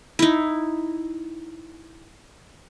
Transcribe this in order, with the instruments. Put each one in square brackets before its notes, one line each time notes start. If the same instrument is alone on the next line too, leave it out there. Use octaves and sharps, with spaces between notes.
[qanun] D#4 E4